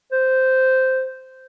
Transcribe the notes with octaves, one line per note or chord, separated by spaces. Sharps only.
C5